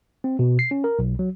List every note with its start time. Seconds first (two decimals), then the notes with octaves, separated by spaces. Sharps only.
0.24 C4
0.39 B2
0.59 C7
0.71 C#4
0.84 A#4
0.99 B1
1.19 F#3